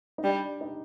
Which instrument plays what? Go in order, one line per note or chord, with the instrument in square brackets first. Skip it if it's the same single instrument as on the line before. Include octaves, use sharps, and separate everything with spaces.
[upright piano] D#4
[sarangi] G3 [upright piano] D4
[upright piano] D#4